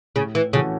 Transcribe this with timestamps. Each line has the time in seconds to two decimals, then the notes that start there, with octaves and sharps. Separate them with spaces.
0.16 A2 C#3
0.35 E3
0.53 C#3 E3 A3 C#4 F#4